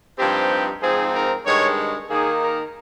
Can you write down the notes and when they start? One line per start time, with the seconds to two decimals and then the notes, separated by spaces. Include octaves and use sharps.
0.18 G2 F3 C4 D#4 G4
0.82 G#2 F3 C4 D#4 G#4
1.14 A#4
1.45 G2 D#3 G#3 C#5
2.09 D#3 A#3 D#4 G#4
2.41 A#4